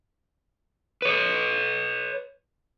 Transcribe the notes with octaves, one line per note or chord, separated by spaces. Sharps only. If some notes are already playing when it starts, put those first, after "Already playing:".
B4 C#5